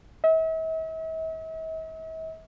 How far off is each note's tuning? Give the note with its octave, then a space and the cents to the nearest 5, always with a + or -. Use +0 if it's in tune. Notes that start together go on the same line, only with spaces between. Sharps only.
E5 -45